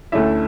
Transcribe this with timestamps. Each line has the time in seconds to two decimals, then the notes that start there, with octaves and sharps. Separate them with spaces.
0.12 D2 D3 A3 C#4 E4 E5